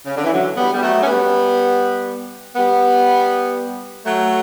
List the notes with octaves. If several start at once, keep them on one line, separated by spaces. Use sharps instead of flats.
C#3
D3
E3
D3 F#3
G3 B3
G3
F#3 A3
C#4
G3 B3
G3 B3
F#3 A3